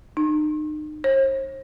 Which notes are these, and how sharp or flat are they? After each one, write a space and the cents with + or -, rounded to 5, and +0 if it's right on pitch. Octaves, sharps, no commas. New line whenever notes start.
D#4 -35
C5 +45